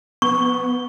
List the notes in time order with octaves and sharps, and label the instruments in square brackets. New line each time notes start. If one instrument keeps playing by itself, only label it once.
[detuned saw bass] B3 [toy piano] C#6